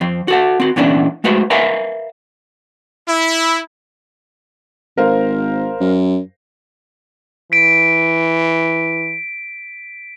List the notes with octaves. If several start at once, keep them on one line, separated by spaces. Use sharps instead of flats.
F2 C4
F#4 A4 F#5
C4 F#4
A#2 E3 B3 C#4 D4 E4
G#3 A3 F#4 B4 C5
A#4 B4 E5 F5 G#5 A#5
E4
G#1 A#4 C5 F5
F#2
E3 B6 D7